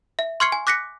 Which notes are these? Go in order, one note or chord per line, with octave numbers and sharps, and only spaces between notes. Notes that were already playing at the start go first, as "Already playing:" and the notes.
E5
C6 C#6 F6 G#6 C7 C#7
G#5
D6 F#6 A#6 B6 C#7